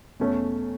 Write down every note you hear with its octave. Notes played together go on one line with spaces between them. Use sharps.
E2 B2 A3 C#4